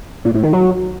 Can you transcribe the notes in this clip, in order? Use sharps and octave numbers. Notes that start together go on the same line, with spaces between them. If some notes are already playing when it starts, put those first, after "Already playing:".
A#2
A2
D#3
F#3